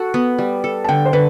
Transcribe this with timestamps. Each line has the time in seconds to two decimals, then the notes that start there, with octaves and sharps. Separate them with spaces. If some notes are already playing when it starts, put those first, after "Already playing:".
Already playing: F#4 A4
0.14 B3
0.39 G3
0.64 A4
0.84 A5
0.89 D3 G5
1.06 C5
1.13 D3 B4